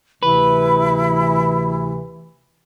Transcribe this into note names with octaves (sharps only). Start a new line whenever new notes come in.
D2 C3 E3 E4 B4